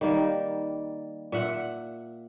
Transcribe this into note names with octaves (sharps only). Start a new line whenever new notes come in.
D#3 G3 A#3
A#2 E5 F#5